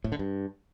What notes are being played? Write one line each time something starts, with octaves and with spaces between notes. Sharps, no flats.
A2
D3
G2